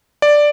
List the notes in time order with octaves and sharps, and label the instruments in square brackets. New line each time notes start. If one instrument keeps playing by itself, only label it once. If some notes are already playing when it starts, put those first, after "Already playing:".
[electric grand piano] D5